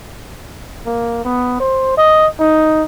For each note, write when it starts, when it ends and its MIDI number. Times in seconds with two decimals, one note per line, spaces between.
0.86 1.25 58
1.25 1.60 59
1.60 1.97 72
1.97 2.27 75
2.40 2.84 63